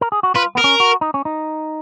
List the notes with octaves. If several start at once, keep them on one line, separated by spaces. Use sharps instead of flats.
A#4
G#4
F#4
F4 B4
B3 A#4
C#4
F#4
D#4
C#4
D#4